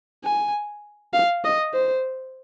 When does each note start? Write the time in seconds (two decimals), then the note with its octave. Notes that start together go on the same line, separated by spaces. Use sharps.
0.24 G#5
1.14 F5
1.45 D#5
1.74 C5